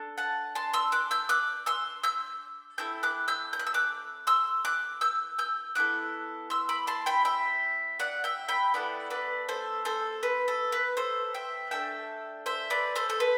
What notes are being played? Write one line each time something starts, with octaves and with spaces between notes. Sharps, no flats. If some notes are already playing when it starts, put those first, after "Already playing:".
Already playing: D4 A4
F#5 A5
A5 C6
C6 E6
D6 F#6
E6 G6
D6 F#6
C6 E6
E6 G6
C4 E4 A4 E6 G6
D6 F#6
E6 G6
G6
F#6
E6
D6 F#6
C6 E6
D6 F#6
E6 G6
E6 G6
B3 E4 A4 D6 F#6
C6 E6
B5 D6
A5 C6
G5 B5
E5 G5
D5 F#5
E5 G5
G5 B5
B3 E4 A4 D5 F#5
B4 D5
A4 C5
A4 C5
B4
A4
B4
A4 C5
E5 G5
A3 D4 A4 E5 G5
C5 E5
B4 D5
A4 C5
A4
B4